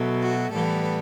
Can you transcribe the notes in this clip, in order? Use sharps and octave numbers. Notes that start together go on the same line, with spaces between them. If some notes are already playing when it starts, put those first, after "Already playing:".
Already playing: B2 F#3 A3
F#4
A2 E3 G3 B3 A4